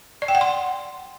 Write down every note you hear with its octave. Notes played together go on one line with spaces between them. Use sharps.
D5
G5
F#5
C6